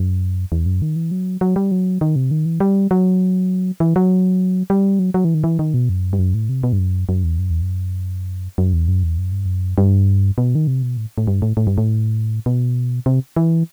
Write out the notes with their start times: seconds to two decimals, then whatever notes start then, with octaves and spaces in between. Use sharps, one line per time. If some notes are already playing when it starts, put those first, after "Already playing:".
Already playing: F#2
0.52 E2
0.66 F#2
0.82 D#3
0.96 E3
1.11 F#3
1.41 F#3
1.56 G3
1.71 F#3
2.01 D#3
2.16 C3
2.31 D#3
2.46 E3
2.60 G3
2.91 F#3
3.80 E3
3.96 F#3
4.70 G3
4.99 F#3
5.14 F#3
5.25 E3
5.34 D#3
5.44 E3
5.59 D#3
5.74 B2
5.89 F#2
6.13 G2
6.19 F#2
6.34 A2
6.49 C3
6.63 B2
6.73 G2
6.79 F#2
7.09 F#2
7.24 E2
7.39 F#2
7.50 E2
7.62 F#2
8.58 F#2
8.73 E2
8.88 F#2
9.03 E2
9.18 F#2
9.32 G2
9.46 F#2
9.78 G2
10.38 B2
10.55 D#3
10.67 C3
10.83 B2
10.97 A2
11.18 A2
11.27 G2
11.42 A2
11.57 A2
11.67 G2
11.78 A2
12.46 B2
13.06 C3
13.36 E3